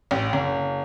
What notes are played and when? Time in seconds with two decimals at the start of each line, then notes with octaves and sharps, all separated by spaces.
0.11 A1
0.33 F#1